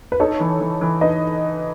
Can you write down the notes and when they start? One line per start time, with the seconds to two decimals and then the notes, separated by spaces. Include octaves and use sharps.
0.12 B4
0.20 D#4 A4 C#5
0.40 E3
0.60 E3
0.81 E3
1.01 D#4 B4 D#5